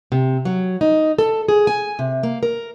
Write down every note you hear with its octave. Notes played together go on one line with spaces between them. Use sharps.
C3
F#3
D#4
A4
G#4
G#5
C3
A#3
A#4